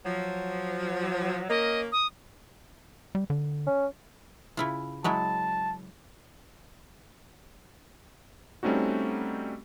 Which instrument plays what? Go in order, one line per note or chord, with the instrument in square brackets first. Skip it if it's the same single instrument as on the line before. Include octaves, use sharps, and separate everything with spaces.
[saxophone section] F3 F#3
[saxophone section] A#3 C#4 A#4 [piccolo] D#5
[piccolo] D#6
[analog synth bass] G3
D3
[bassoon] C#4
[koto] C#3 E4 F4
[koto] F#3 G#3 E4 [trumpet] A5
[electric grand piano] G3 A3 C4 C#4 D#4 F#4